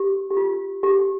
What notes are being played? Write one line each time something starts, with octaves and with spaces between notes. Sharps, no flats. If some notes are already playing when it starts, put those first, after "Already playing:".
Already playing: G4
G4
F4
G4